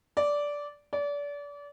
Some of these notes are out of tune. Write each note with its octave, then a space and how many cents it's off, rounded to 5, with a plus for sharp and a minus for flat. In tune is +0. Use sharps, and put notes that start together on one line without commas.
D5 -10
D5 -30